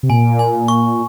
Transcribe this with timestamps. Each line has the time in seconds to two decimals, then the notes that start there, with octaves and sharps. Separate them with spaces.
0.03 C3
0.09 A#2 G#5
0.39 G#5
0.68 C#6